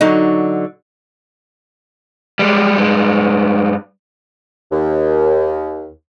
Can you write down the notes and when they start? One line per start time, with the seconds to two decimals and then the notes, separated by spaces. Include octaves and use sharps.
0.01 D3 F#3 D#4
2.39 G3 G#3
2.77 G2 G#3
4.71 D#2